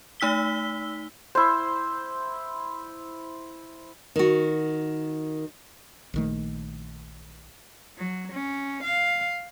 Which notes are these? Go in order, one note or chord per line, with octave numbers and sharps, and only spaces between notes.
A3 D#4 E6 B6 G7
E4 C5
D#3 F#4
A#1 D#3 A3
F#3
C#4
F5